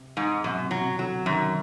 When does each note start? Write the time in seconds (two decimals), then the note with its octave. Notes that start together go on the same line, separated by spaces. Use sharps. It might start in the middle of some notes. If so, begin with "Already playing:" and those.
Already playing: C3
0.17 G#2
0.44 F#2 B2
0.63 C3
0.71 F#3
0.81 C3
0.99 D3 F#3
1.26 F#2 D#3